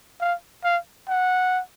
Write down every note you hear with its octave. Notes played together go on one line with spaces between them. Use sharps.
F5
F5
F#5